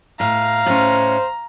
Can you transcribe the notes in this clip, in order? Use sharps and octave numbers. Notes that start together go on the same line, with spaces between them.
A2 F5 A#5
A2 C#4 C5